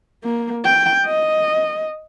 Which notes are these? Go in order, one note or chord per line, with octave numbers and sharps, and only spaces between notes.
A#3
G5
D#5